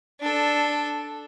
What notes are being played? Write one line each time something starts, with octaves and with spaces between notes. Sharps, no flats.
D4 A4